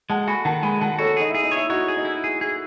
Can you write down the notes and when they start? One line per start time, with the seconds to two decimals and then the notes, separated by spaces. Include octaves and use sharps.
0.10 G#3 F#5 A5
0.27 F#4 G#5 B5
0.45 D#3 F#5 A5
0.63 G#3 G#5 B5
0.81 D#3 F#5 A5
0.99 F#4 A4 C#5
1.17 D#4 G#4
1.30 E4 G#4
1.43 D#4
1.52 E4 C#5
1.69 D#4 F#4 C#5
1.88 G#4
1.97 D#4
2.05 E4
2.24 G#4
2.41 G#4